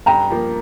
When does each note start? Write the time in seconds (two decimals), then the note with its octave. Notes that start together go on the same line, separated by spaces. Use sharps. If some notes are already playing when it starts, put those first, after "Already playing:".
0.06 G2 G5 A#5
0.31 F3 A#3